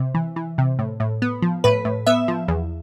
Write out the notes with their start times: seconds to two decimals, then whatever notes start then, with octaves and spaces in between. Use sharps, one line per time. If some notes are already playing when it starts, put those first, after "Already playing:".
Already playing: C3
0.14 E3
0.36 E3
0.58 C3
0.79 A2
1.00 A2
1.22 B3
1.42 F3
1.64 A2 B4
1.85 A2
2.07 B3 E5
2.28 F3
2.48 E2